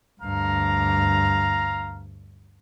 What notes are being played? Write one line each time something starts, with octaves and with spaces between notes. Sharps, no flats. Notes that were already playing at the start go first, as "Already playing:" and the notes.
D2 G2 F5 A#5